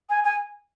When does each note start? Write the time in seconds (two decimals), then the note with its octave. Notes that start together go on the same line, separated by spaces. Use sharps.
0.09 G#5
0.24 G#5